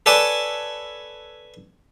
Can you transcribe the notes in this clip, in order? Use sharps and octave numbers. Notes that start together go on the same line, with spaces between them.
A4 B4 C#5 D5 G#5 A5